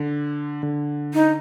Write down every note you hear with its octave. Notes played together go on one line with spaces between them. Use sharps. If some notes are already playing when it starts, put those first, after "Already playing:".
Already playing: D3
D3
D#4